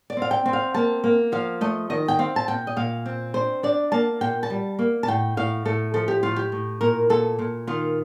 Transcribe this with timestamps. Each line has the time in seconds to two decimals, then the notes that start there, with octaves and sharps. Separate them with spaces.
0.10 D5
0.17 C4 F5
0.31 G5
0.46 C4
0.53 F5
0.74 A#3 A5
1.04 A#3
1.32 F3 F5
1.61 A3 D#5
1.90 D#3 D#5
2.08 G5
2.19 C4 F5
2.36 A5
2.48 A#2 G5
2.67 D#5
2.76 A#2 F5
3.06 C4
3.34 D4 C5
3.63 D4 D5
3.92 A#3 A5
4.21 A#2 G5
4.43 A5
4.50 G3
4.79 A#3
5.03 A5
5.07 A2 G5
5.37 A2 F5
5.65 A2 A4
5.94 F3 A4
6.08 G4
6.23 A2 F4
6.36 G4
6.52 A2
6.81 A#2 A#4
7.10 A#2 A4
7.39 A#2
7.67 D#3 F4